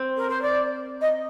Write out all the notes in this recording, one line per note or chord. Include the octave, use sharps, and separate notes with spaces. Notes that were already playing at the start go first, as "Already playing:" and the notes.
Already playing: C4
A#4
C5
D5
D#5